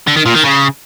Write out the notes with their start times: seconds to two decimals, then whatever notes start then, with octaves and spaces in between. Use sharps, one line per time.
0.07 D3
0.17 D#3
0.26 A#2
0.35 D#3
0.44 C#3